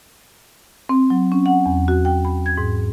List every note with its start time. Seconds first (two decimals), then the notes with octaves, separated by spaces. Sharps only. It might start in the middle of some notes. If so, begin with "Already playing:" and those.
0.89 C4
1.10 F#3
1.32 C#4
1.46 F#5
1.66 E2
1.88 F#4
2.05 G5
2.25 B5
2.46 G#6
2.57 G#2